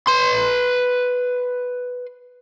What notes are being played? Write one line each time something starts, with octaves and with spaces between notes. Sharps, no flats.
B4 C6